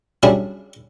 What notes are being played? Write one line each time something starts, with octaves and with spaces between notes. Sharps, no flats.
F#3 G3 C#4 D4 E4 G#4